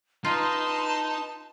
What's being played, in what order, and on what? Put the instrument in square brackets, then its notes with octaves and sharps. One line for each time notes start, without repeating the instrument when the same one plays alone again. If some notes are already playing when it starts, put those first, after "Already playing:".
[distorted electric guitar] D#4 D#5 [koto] F4 [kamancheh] B4 C6 [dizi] A5